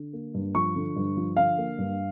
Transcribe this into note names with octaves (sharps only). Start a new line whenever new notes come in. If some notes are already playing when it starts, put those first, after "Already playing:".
Already playing: D3
A#3
G2
F3 C#6
D3
G2
F3
D3 F5
A#3
G2